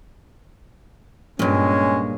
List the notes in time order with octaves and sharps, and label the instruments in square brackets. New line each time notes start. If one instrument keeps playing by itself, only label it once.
[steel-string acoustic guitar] G2 A#2 [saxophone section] G#3 C#4